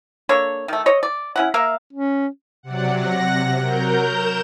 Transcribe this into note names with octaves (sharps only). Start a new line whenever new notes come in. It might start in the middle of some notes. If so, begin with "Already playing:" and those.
A#3 D4 A4 C#5
D#3 A3
C#5 D#5
D5
C#4 E4 F#5
A#3 A#4 E5 F5
C#4
C3 F#3 D5 F#5
F#5 A#6
C3
F#3 A#4 A#5 G6
E7